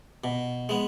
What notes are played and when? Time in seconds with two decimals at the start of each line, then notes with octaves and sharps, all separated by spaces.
0.24 B2
0.69 G#3 B3